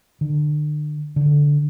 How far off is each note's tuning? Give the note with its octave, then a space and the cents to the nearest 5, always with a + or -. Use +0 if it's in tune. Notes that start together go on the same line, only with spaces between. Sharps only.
D3 +35
D3 -10